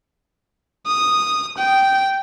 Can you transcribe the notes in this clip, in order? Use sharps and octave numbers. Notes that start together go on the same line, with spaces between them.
D#6
G5